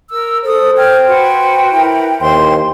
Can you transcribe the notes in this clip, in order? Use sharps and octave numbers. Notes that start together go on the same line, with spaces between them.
A#4 E6
A4 C5 D#6
G5 F6 G6 G#6
F#4 B4 C6
E4 A#4 B4
D#2 C5 G#5 C6